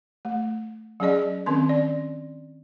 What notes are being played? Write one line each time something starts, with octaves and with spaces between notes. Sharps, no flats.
A3
F#3 C#4 G#4 D5 D#5
D#3 C4 C#4 C6
D5